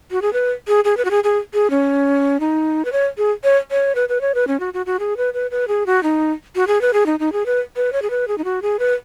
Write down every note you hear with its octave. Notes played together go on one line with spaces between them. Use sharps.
F#4
G#4
B4
G#4
G#4
B4
F#4
G#4
G#4
G#4
C#4
D#4
B4
C#5
G#4
C#5
C#5
B4
B4
C#5
B4
C#4
F#4
F#4
F#4
G#4
B4
B4
B4
G#4
F#4
D#4
F#4
G#4
B4
G#4
D#4
D#4
G#4
B4
B4
C#5
G#4
B4
G#4
D#4
F#4
G#4
B4